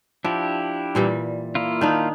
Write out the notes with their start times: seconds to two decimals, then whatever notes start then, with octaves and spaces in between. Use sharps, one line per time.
0.25 F3 D4 E4 G4
0.95 A#2 E3 G3
1.55 A#3 E4 F4
1.81 D#3 D4 D#4